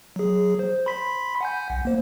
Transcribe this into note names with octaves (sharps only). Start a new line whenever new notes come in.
F#3 G#4
C5
B5 C6 B6
F#5 G#5 G6
B1
A#3 C5